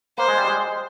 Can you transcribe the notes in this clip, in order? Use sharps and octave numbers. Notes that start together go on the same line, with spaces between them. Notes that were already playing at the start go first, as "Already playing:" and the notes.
A#3 C5
G#3
G3
G#3